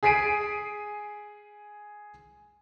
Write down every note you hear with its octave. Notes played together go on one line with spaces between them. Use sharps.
G#4 G#5 B6 C7 D7 D#7